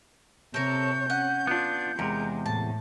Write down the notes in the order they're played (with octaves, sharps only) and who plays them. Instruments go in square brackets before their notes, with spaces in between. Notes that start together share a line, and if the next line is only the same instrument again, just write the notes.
[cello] C3 C#5 [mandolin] A4 A#4 [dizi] G6
[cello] C#4 [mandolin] F#5
[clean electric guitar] B3 D4 [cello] F4
[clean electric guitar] E2 C3 [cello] G#3 [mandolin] A#4
[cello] A2 [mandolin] A5